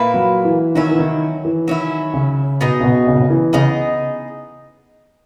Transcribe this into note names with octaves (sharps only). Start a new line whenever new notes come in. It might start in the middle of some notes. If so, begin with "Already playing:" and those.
Already playing: A#2 A#3 E4 B4
F#3
E3
D#3 F#3 C#4 E4
E3
D#3
E3
D#3 F#3 C#4 E4
C#3
B2 B3 D#4 G#4 D#5
C#3
B2
C#3
B2
C#3
E3
C#3 B3 D#4 G#4 D#5